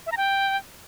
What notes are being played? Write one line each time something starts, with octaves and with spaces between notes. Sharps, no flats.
E5
A#5
G5